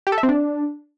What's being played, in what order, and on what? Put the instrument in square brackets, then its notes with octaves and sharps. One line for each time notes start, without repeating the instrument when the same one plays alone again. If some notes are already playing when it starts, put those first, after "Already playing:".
[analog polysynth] G4
A4
E5
C4
D4